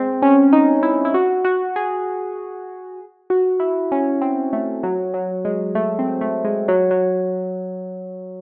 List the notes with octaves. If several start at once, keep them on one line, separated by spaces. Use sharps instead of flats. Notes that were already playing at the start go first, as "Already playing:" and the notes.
Already playing: G#3 C4
C#4
D#4
E4
E4
F#4
F#4
G#4
F#4
E4
C#4
C4
A3
F#3
F#3
G#3
A3
C4
A3
G#3
F#3
F#3